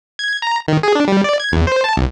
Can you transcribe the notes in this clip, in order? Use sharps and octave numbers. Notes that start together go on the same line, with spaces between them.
G#6
A#5
D#3
G#4
D4
G3
D5
G#6
E2
C5
A5
C2